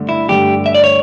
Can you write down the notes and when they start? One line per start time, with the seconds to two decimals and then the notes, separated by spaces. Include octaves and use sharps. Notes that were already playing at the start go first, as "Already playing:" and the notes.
Already playing: G2 D3 A3
0.09 E4
0.29 G2 D3 A3 G4
0.66 E5
0.75 D5
0.84 C#5